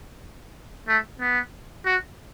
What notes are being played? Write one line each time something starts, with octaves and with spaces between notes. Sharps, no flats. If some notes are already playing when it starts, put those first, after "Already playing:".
A3
B3
F#4